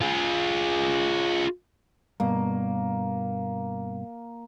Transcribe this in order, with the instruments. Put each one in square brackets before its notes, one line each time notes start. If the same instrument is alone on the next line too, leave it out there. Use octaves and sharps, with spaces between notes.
[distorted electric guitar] F4 G#4
[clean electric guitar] G2 B2 [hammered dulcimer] A#3